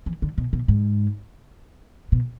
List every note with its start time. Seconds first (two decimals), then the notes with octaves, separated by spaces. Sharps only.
0.06 E3
0.22 D3
0.38 B2
0.53 B2
0.68 G#2
2.12 B2